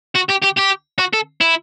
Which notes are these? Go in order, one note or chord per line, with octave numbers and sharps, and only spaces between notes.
F#4
G4
G4
G4
F#4
A4
E4